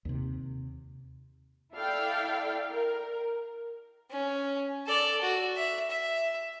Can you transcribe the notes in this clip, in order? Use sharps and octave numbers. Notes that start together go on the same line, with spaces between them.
D#2 C3
E4 A4 D5 F5 G5
A#4
C#4
A4 D5
F#4
E5
E5